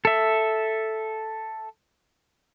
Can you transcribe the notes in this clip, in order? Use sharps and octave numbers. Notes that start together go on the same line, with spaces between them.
A4 E5